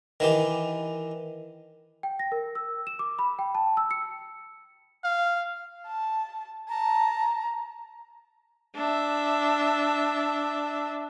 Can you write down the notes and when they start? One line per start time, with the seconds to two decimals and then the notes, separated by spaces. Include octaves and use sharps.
0.20 D#3 E3 G4
2.03 G5
2.19 A#6
2.32 A#4
2.55 E6
2.87 E7
2.99 D6
3.19 B5
3.39 G5
3.55 A5
3.77 E6
3.91 C#7
5.04 F5
5.86 A5
6.69 A5 A#5
8.75 D4 E5